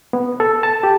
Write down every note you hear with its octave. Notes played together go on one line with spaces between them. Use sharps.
B3
A4
A5
G4